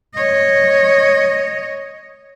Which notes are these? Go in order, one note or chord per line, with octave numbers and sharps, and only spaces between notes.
C#5 D#5